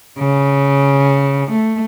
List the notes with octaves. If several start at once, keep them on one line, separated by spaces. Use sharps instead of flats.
C#3
A3